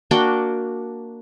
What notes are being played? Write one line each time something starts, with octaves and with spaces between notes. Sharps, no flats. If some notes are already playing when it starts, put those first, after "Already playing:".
A#3 D4 F#4 G5